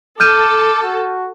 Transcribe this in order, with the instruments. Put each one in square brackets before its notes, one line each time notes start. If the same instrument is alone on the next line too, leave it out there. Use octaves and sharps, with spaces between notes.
[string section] A4 [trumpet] D6 [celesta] F6 G6 D#7
[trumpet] F#4